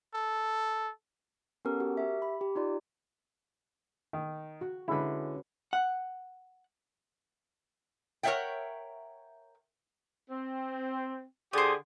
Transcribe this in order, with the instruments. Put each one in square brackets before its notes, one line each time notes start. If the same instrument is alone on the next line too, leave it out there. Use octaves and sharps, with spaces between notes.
[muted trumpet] A4
[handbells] B3 C#4 G4 A4 A#4
F#4 G4 A#4
G4 E5
B5
G4
D#4 F4 D5
[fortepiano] D#3
[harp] F#4
[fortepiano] D3 G#3 [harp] C#4 B4 [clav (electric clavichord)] E4
[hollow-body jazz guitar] F#5
[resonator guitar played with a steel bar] A#4 C#5 D5 E5 F#5 G5
[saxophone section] C4
[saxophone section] D3 G4 G#4 [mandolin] C5 D#6